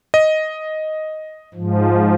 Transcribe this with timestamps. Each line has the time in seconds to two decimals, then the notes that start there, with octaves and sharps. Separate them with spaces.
0.14 D#5
1.55 G#2 F3